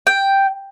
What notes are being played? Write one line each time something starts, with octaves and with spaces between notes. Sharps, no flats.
G5